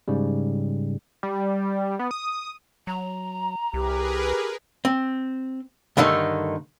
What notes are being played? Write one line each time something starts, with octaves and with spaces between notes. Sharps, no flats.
G#2 C#3 G3
G3
B3
D#6
F#3 A#5
C2 G4 G#4 A#4 B4
C4
G2 D3 D#3 A3 D#4